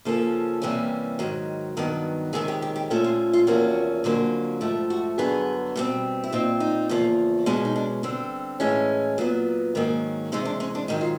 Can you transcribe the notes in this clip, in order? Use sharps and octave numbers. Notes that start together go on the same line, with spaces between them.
C#3 F3 A#3 C#4 A4
C3 E3 G3 A#3 C#4
G#2 D#3 F#3
G2 D#3 F#3 B3
F2 C3 D#3 G#3 C#4 G#4
G4
G4
G4
A#2 F3 A3 C#4 A4
F4
F4
E2 C3 F3 A#3 C#4 F#4
F2 D3 F#3 A#3 C#4
G#2 F3 A3 G4
F#4
G2 D3 F#3 B3 G#4
B2 G3 C4
E4
A#2 G3 C4 D#4
D#4
E2 C#3 F3 A#3
B2 G#3 C#4 D4
D#4
D4
D3 G3 C4
A2 E3 G#3 C#4
A#2 F#3 B3
G#2 D#3 F#3 A#3 C#4
C3 E3 G#3 C#4 D#4
D4
C#4
D4
G#2 D#3 F#3 D#4
F4